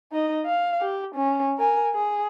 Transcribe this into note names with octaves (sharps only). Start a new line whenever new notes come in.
D#4 D#5
F5
G4
C#4
A#4 G#5
G#4